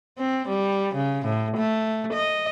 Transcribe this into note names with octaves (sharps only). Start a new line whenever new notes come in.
C4
G3
C#3
A2
A3
D#5